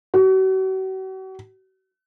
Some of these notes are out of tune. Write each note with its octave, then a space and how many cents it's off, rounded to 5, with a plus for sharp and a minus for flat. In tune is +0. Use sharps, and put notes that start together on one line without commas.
F#4 +40